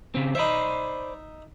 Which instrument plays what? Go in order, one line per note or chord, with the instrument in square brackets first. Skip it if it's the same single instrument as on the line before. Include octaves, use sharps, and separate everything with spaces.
[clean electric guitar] C#3 C4
[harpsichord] D#4 E5 [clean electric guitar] C5 D5 B5